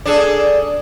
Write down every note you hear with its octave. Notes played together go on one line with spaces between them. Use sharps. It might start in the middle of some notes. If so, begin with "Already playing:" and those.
D4 G#4 A4